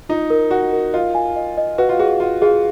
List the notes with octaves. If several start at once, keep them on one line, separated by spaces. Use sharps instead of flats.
D#4 F4
A#4
F#4 D#5
A#4
F4 D#5
G#5
D#5
D#5
F#4 B4
F4
F#4 G#4
F4 G#4
F4 G#4